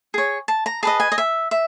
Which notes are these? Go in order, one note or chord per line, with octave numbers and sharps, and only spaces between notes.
G#4 C#5
A5
A#5
G#4 B4 D#5 A5
G#5
D#5
E5
E5